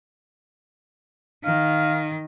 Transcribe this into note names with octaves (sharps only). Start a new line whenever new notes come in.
D#3 F5